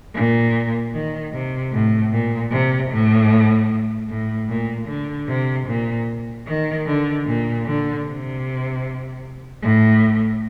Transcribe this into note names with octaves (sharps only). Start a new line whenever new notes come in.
A#2
D#3
C3
A2
A#2
C3
A2
A2
A#2
D3
C3
A#2
D#3
D3
A#2
D3
C3
A2